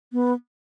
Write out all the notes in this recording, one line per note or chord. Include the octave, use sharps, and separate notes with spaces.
B3